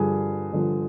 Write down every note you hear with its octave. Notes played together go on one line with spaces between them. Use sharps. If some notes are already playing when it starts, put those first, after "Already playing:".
Already playing: G2 D3 F3 G#4
G2 D3 F3